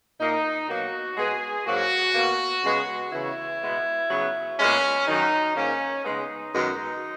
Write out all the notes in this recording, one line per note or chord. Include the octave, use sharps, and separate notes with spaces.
A#2 A#3 D#4
B2 F#3 A#3 F#4
B2 G#3 B3 G#4
G#2 F#3 A#3 F#4
B2 A#3
C#3 G#3 B3
C#3 E3 B3 E4
B2 G#3 B3
C#3 F#3 B3
A#2 G#3 B3 C#4
F#2 D#3 F#3 D#4
G#2 D#3 A#3 C#4
C#3 G#3 B3 D#4
F#2 D#3 G#3 B3